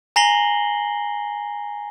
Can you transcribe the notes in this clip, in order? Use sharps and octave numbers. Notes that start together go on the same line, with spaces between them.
G#5 A#5 A#6 C7 F#7 G7